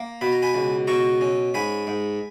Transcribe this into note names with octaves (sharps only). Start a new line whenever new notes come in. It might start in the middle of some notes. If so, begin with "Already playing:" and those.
Already playing: A#3
B2 B5
A#5
G#5 B5
C#2
B2 A#5 C#6
C#4
G#2 G#5 B5
G#2